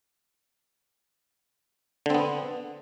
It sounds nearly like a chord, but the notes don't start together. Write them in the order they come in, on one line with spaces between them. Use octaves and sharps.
D3 C4 B3